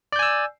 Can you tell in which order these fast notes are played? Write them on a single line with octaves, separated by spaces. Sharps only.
D5 G6 G#5 E6